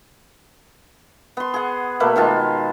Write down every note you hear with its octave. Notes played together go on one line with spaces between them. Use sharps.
B3 C6
G#4 F#5
B2 A3 A#3 B4
D#3 G#3 F4 A5